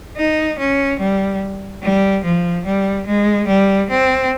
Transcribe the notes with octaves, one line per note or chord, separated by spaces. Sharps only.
D#4
C#4
G3
G3
F3
G3
G#3
G3
C4